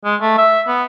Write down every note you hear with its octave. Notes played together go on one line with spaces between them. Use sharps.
G#3
A3
E5
B3